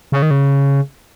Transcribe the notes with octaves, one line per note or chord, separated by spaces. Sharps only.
C#3
D#3
C#3